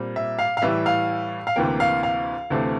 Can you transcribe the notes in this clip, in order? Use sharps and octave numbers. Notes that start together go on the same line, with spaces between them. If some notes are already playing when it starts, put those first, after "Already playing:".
Already playing: A#2 G3 C4
E5
F5
F5
A2 E3 G3 E5
F5
F5
D2 C3 E3 A#3 G5
F5
F5
D2 C3 E3 A3 C4